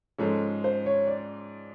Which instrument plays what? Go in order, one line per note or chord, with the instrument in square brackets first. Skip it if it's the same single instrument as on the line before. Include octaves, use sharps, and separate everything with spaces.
[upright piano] G#2 F3 G#3 C#4 [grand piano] A4
[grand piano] C5
C#5
D5